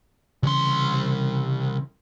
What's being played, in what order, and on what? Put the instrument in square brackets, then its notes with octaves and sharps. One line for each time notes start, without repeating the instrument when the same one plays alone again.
[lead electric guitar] C2 C6 [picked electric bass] C#3 E3 C#4